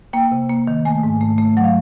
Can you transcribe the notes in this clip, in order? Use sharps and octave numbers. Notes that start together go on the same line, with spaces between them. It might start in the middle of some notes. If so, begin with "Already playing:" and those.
A#3 G5
C3
A#3
D#3
A3 G#5
G#2
A3
A3
F#3 F#5
F5